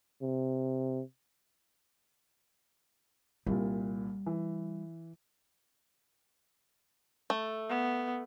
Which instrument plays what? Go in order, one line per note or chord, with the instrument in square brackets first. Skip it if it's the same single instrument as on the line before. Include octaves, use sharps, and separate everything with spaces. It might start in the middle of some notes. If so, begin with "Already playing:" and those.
[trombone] C3
[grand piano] C2 A#2 [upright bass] G3
[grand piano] E3
[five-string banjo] A3
[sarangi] B3